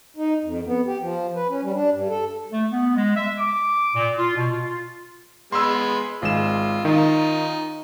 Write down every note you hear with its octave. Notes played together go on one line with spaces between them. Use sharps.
D#4
F2
B3
G4
F3
B4
C#4
G3
D4
G2
A4
A3
B3
G#3
E5
D6
A#2
F4
B2
F4
G#3 B3 B4 C6 E6
G#1 G#3 F4 E7
D#3 D#4 F4